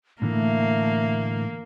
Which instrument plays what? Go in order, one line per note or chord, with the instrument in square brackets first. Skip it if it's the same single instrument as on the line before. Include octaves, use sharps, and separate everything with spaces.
[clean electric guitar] A2 D3 E3 [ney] A3 [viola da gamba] A#3